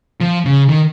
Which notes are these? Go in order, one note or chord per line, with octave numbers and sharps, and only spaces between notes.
F3
C#3
D#3